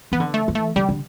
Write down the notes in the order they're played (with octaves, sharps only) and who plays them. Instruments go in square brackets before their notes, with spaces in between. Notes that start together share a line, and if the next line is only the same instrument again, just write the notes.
[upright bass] E3 [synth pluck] B3
[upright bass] D3
[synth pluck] A3
[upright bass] E3
[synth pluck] A3
[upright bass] D3 [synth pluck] G3
[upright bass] D3